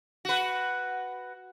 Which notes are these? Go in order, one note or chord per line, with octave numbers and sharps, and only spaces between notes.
F#4 B4